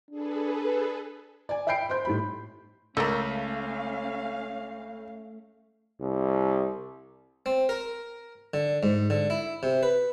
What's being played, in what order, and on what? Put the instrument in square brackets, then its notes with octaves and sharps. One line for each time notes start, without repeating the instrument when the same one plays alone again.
[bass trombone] D4 [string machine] G#4 A4 B4
[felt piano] D5 G#5
E5 G5 B5 G6 C7 D7
C5 C6 G6
A2 G3 B5
[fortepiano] C#2 [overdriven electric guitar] A3 [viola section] C#4 F5 [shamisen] A4 A#4
[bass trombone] C2
[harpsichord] C4
A#4
D3
G#2
D3
E4
C3
B4